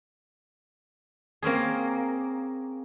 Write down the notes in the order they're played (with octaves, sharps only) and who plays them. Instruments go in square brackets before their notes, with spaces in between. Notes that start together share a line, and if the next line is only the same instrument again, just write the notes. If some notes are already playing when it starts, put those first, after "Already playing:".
[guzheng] A#3 C4 C#4 G#4